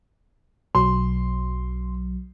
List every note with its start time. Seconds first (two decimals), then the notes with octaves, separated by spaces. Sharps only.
0.75 B1 F#3 C6